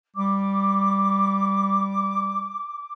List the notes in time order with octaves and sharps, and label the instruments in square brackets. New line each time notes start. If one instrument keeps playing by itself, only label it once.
[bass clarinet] G3 [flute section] D6